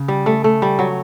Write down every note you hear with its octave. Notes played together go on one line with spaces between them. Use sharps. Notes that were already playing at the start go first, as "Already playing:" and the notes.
Already playing: C#3
G3
A3
A3
G3
F#3